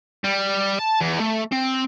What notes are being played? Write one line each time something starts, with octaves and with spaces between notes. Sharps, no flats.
G3
A5
E2
A3
C4